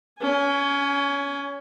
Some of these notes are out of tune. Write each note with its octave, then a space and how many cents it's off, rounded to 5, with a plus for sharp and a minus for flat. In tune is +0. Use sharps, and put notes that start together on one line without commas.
C#4 +25 G#5 +0